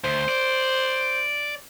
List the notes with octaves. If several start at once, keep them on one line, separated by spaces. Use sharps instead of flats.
D2 C5
D5